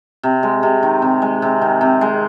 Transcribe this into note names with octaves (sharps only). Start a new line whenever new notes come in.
C3
G#3
C3
D#3
C3
G#3
C3
D#3
C3
G#3